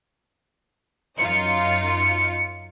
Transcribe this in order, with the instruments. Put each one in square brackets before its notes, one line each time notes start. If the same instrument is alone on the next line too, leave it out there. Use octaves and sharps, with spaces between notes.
[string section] F#2 D#4 F4 [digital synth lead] C#7